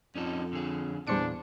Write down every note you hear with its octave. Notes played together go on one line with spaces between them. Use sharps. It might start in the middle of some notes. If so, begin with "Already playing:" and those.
F2 C#4 D#4 A4
D3 G#4
E2 A#2 G3 D4 C5 C#7